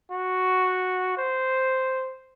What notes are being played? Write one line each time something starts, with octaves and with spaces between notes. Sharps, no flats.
F#4
C5